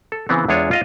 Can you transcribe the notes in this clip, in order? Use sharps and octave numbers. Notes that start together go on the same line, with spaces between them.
A4
C#3 E3 B3 C4
E2 G#3 D4 F4 C#5 G#5
F4 D#5 F5